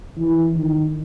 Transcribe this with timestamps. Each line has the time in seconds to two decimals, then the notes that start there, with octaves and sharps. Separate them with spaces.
0.18 E3
0.57 D#3